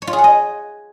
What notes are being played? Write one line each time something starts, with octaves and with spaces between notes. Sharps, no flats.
C#5
F4
G#4
F#5
D#5